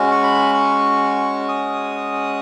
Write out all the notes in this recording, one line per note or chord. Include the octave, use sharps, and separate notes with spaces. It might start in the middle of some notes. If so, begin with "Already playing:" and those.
Already playing: G#3 C#4 F#4
C#6
B5
C#6
D#6